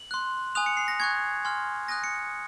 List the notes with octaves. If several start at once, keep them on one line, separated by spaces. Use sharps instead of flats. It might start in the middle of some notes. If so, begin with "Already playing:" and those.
Already playing: F#7
C6 F#6
G#5 D#6 F#6 F7
C#7
C7
A#6
G#5 C#6 F#6 G#6
G#5 C6 F6
G#5 D#6 F#6 A#6
C#7